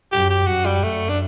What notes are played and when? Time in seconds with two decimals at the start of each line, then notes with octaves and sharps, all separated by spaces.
0.12 F#2 G4
0.30 G4
0.47 F#2 F#4
0.66 G3
0.83 F#2 A3
1.09 D4